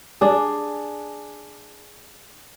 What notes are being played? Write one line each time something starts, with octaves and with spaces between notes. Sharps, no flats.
D4 G#4